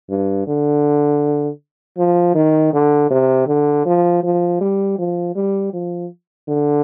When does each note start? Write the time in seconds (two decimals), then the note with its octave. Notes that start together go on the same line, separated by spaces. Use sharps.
0.10 G2
0.47 D3
1.98 F3
2.35 D#3
2.73 D3
3.11 C3
3.47 D3
3.86 F3
4.23 F3
4.61 G3
4.99 F3
5.36 G3
5.73 F3
6.48 D3